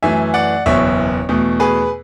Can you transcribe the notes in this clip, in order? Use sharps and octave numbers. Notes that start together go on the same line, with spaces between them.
F#2 E3 A3 E5 G#5
D5 F#5
F#1 E2 B2 F#3 B3 C#5 E5
E2 B2 A3
G#4 B4